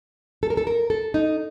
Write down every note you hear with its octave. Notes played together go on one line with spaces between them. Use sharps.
A4
A#4
A4
A#4
A4
D#4